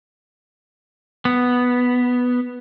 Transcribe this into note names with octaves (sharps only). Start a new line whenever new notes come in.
B3